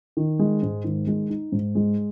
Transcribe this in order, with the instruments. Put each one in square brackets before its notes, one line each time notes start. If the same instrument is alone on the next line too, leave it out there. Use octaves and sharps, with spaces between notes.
[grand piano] D#3
G#3
G#2
D#3
G#3
D#4
G#2
G#3